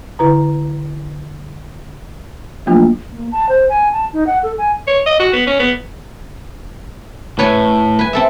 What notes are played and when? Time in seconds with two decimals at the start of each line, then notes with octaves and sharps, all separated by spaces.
0.19 D3 E4 B4 A#5
2.66 F3 F#3 A3 A#3 D4 F4
3.12 A#3
3.32 A5
3.49 C5
3.69 G#5
3.93 A5
4.13 D#4
4.27 F#5
4.43 A4
4.58 G#5
4.87 C#5
5.06 D#5
5.19 F#4
5.33 B3
5.47 C#4
5.59 B3
7.39 A2 B4 C#5 G#5
7.99 B4 G#5
8.13 C4 A4 E5